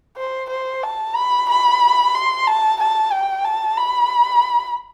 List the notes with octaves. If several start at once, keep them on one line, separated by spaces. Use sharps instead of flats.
C5
C5
A5
B5
B5
C6
A5
A5
G5
A5
B5